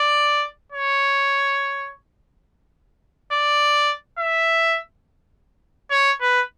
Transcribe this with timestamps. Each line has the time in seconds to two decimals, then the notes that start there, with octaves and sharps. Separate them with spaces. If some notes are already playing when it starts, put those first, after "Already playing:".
Already playing: D5
0.72 C#5
3.33 D5
4.19 E5
5.91 C#5
6.21 B4